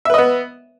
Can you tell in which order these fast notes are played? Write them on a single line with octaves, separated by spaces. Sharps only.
E5 B4 D#5 B3